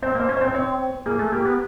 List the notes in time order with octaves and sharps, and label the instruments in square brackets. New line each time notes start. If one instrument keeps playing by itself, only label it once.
[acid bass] C4 [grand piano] C5
[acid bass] A#3
[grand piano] C5
[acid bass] C#4
[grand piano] C5
[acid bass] C4
[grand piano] C5
[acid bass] C4 [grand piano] C#5
[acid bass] A#3 [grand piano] G#4
[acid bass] A3
[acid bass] A#3 [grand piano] G4
[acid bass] B3